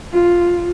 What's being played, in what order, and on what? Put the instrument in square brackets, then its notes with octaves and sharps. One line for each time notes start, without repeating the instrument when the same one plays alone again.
[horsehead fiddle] F4